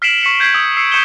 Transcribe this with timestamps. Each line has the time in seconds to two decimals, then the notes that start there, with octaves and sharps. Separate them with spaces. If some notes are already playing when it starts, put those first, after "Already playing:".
0.02 F6 B6 C7 D7 E7 F#7
0.21 C#6 B6 C#7 E7
0.40 G6 G#6 B6 C7 D7 F#7
0.54 D#6 E6
0.77 E6 C7 C#7
0.92 C#6 G6 C#7 E7 G7